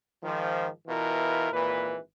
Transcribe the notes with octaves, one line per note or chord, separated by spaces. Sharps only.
G#2 D#3 F3
B2 E3 E4 F4 A#4
G#1 A#2 E3 B4